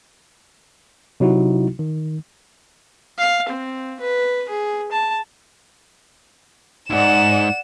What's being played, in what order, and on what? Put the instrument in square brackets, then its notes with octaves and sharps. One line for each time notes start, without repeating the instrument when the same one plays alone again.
[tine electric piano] C3 F#3 D#4 E4 F#4
D#3
[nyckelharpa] F5
C4
B4
G#4
A5
[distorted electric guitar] D#2 G#2 [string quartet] D5 F#5 [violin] E7